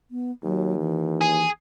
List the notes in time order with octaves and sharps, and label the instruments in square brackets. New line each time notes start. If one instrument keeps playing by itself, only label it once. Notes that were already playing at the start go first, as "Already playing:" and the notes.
[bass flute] B3
[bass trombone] D#2 [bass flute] F#3
[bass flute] E3
[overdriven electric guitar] G#4